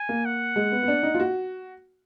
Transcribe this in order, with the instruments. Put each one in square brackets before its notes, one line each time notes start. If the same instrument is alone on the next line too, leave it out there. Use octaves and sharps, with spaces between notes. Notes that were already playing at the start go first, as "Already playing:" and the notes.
Already playing: [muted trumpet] G#5
[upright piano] A#3
[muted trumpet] F#5
[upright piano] G#3
B3
B3
D4
D#4
F4
F#4